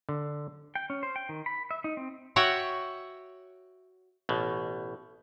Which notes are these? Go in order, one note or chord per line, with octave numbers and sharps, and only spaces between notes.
D3
G5
C#4
C5
G5
D#3
B5
E5
D#4
C4
F#4 C#5 E5 F#5 G5
A1 B2